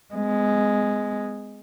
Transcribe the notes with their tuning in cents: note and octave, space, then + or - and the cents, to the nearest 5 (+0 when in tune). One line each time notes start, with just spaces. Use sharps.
G#3 +0 B3 +45